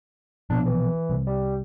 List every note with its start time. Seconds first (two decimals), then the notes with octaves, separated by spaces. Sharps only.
0.50 A#1 B2 D4
0.66 E3
1.10 C2
1.27 G3